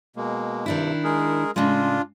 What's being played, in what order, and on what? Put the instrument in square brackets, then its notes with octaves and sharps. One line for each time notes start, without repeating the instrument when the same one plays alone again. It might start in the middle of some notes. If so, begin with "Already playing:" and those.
[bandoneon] B2 G#3 A#3
[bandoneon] G2 C3 [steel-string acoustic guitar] D#3 D4 E4
[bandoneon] G#3 G#4 A#4
[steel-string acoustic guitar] A2 C#3 G#3 [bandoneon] D4 F4